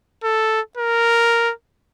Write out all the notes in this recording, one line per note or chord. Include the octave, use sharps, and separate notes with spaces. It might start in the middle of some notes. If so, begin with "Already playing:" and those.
A4
A#4